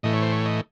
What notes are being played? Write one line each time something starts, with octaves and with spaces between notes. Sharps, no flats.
A2 E3 A3 D#5
C#5
C5
C#5
D#5